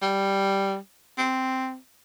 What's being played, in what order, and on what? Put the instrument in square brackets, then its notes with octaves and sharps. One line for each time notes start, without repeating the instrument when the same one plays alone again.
[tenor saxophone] G3
C4